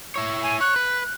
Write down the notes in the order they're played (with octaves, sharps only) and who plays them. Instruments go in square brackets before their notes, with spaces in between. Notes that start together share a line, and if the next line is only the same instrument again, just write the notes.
[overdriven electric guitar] E4 C#5
[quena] G#5
[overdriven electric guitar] C#5 [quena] F#6
[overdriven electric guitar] B4